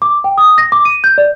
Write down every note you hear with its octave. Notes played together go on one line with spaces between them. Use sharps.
D6
G5
D#6
A#6
D6
D#7
G6
D5